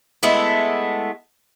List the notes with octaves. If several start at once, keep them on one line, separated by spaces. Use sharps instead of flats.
G#3 A3 B3 E4